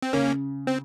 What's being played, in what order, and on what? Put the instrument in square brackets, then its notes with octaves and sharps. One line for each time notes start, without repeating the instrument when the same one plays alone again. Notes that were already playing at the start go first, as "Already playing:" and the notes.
[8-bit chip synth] C4
[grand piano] C#3 [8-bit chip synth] A#3 C#4
[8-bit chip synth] C4